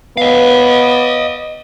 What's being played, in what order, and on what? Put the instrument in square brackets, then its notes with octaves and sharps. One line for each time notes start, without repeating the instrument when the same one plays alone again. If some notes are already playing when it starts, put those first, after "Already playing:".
[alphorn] B3 [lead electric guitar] D#5 F5